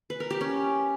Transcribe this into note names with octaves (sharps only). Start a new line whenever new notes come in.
B4
A#4
G4
C#4